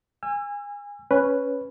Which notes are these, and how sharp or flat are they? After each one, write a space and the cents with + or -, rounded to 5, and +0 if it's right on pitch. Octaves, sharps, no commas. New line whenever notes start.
G#5 -25 E6 +35
C#4 +0 B4 +0